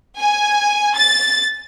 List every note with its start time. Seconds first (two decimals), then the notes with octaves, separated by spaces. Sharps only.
0.19 G#5
0.95 A6